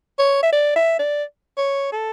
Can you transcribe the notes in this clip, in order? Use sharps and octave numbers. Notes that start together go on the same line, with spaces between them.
C#5
E5
D5
E5
D5
C#5
A4